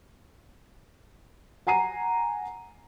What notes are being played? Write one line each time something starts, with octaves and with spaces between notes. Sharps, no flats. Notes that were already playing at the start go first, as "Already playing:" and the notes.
F#5 G#5 A#5 C7 D#7